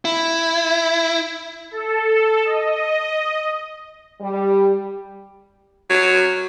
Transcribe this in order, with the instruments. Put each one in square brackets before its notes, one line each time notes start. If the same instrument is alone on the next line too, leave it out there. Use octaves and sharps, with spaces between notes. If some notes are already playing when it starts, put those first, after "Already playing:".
[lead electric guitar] E4
[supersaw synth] A4
D#5
[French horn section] G3
[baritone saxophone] F#3